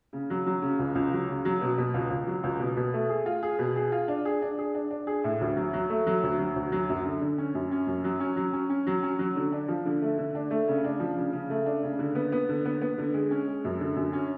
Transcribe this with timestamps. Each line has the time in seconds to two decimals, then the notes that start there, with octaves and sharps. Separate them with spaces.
0.13 C#3
0.30 F#3
0.47 F#3
0.62 C#3
0.79 C#2
0.95 C#2
1.13 F#3
1.29 C#3
1.45 F#3
1.61 B2
1.78 B2
1.94 C#2
2.10 C#2
2.27 F#3
2.44 C#2
2.60 B2
2.77 B2
2.93 A3
3.09 G#4
3.26 F4
3.43 G#4
3.59 B2
3.76 G#4
3.92 F4
4.08 D4
4.25 G#4
4.42 D4
4.58 G#4
4.75 D4
4.91 D4
5.07 G#4
5.24 A2
5.41 D2
5.57 F#3
5.73 F#3
5.90 A3
6.07 F#3
6.23 D2
6.39 F#3
6.56 D2
6.72 F#3
6.89 F#2
7.06 D3
7.21 D3
7.38 C#4
7.54 F#2
7.71 C#4
7.87 F#2
8.04 F#3
8.20 C#4
8.37 F#3
8.53 C#4
8.70 C#4
8.87 F#3
9.03 C#4
9.19 F#3
9.36 D3
9.52 D4
9.68 F3
9.86 D3
10.02 A3
10.18 D3
10.35 D4
10.50 A3
10.68 C#3
10.84 D4
11.00 F3
11.17 C#3
11.33 C#3
11.50 A3
11.66 D4
11.83 C#3
11.99 D3
12.15 B3
12.32 B3
12.49 D3
12.65 B3
12.81 B3
12.98 D3
13.14 G#3
13.31 C#4
13.47 G#3
13.64 F#2
13.80 D3
13.96 F#2
14.13 C#4